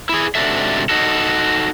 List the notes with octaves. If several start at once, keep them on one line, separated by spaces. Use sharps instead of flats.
E4 G#4
G#2 C3 D4 F#4 A4 E5
D#4 F#4 A4